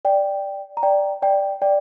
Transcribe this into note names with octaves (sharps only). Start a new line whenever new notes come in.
D5 G5
A#5
D5 G5
D5 G5
D5 G5